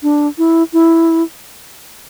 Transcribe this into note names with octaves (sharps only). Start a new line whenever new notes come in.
D4
E4
E4